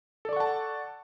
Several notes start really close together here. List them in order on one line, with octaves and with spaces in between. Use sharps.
A4 D5 C#6 F#5 A5